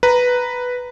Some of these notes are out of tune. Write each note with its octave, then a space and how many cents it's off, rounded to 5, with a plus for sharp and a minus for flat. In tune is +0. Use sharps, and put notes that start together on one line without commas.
B4 +0 A#5 +0